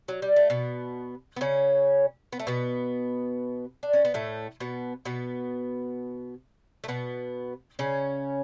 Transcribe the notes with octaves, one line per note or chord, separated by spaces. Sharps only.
F#3
G3
A3
B2 B3
B3
C#3 C#4
B3
A3
B2 B3
D4
C#4
B3
A2 A3
B2 B3
B2 B3
A3
B2 B3
C#3 C#4